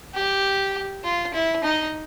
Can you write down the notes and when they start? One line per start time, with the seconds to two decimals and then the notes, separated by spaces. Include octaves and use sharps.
0.14 G4
1.04 F4
1.34 E4
1.64 D#4